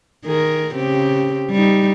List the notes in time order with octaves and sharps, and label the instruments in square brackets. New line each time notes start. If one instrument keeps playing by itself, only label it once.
[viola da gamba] D#3 G#4 A#4
C#3 C4 G4
G3 D#4